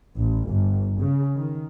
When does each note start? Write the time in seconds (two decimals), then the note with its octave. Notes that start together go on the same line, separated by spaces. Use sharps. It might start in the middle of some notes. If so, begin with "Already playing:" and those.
0.16 A1
0.48 G1
1.00 C#3
1.37 D#3